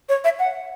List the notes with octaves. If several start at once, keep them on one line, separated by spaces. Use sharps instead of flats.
C#5
E5
F#5